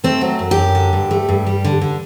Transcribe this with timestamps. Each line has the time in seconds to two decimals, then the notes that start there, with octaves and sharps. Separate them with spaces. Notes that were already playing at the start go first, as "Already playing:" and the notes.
0.04 A3 C4
0.21 F#3
0.39 F#2
0.51 G4
0.57 F#2
0.75 D3
0.93 G2
1.11 A3
1.29 G2
1.46 G3
1.65 D3
1.81 D3